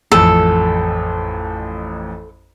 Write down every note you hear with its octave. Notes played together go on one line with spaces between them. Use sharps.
A1 F2 A4